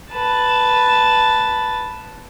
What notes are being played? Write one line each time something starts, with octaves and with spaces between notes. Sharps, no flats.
B4 A5